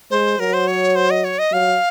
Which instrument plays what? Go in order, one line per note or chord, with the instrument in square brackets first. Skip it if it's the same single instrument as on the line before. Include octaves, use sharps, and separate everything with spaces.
[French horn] G#3 [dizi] C5
[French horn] F#3 [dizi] A#4
[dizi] C5
C#5
C5
D#5
C#5
D#5
[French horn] F#3 [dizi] F5